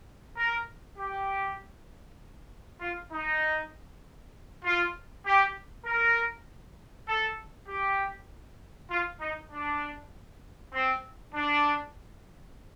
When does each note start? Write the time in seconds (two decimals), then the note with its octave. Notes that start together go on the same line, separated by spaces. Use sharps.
0.37 A#4
0.98 G4
2.81 F4
3.12 D#4
4.64 F4
5.25 G4
5.86 A#4
7.08 A4
7.69 G4
8.91 F4
9.21 D#4
9.52 D4
10.74 C4
11.35 D4